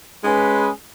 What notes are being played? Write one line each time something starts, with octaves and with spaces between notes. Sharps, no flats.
G#3 C#4 G#4 B4